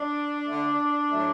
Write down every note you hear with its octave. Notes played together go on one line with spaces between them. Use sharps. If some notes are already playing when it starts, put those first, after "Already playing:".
Already playing: D4
D3 A3
A2 F#3 A3